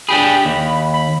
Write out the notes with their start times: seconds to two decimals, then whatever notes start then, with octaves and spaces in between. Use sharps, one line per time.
0.09 D4 G4 G#4 B5
0.45 D#2
0.94 B5